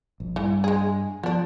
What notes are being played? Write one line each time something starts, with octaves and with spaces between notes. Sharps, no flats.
A#1
G2 E3
G#3 G#4
F3 B3 D4